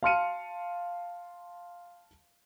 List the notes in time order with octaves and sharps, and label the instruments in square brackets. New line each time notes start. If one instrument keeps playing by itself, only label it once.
[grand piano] F5 A5 C6 F6 C#7 D#7